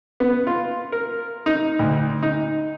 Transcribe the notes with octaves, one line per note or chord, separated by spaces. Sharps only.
B3
F4
A#4
D#4
D2
D#4